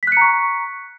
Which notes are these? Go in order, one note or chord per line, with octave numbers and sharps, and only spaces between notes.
A#5 C#6 F#6 B6 C#7